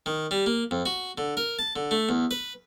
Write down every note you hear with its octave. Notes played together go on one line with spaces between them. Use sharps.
D#3
G3
A#3
F2
F#4
D3
A#4
A5
D3
A3
E2
B4